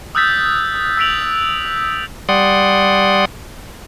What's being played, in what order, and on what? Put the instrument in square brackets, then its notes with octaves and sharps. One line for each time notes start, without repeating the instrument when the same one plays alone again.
[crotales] D#6 E6 F#6 G6 A6 B6
E6 G6 B6 D7 F7 F#7
[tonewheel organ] G3 D5 F#5 C6 D#6